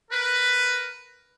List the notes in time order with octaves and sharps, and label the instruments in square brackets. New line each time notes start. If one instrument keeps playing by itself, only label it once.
[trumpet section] A#4 B4